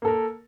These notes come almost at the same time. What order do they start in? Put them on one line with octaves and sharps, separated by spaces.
A#3 A4 A#4